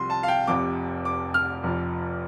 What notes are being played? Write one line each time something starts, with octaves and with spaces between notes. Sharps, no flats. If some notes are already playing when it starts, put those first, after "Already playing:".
Already playing: C2 C3 F3 C6
A5
F5
G5
F1 F2 C3 D6
D6
F6
F1 F2 F3